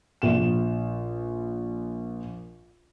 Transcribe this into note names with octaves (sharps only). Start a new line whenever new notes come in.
A#1 E7